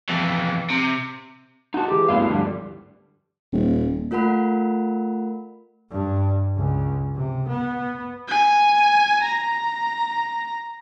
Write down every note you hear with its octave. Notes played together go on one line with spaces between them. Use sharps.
F2 E3
C3
D#4 F#4 F#5 A5
E3 G#3 G4
G#1 D2 G2 B3 E4 F5
F2 D3 G3
D#1
A3 F4 A#4 F#5 B5
G2
C#2
C3
B3
G#5
A#5